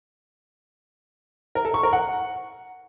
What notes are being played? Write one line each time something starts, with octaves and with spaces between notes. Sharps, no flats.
A#4
A4
C#6
A#4
F#5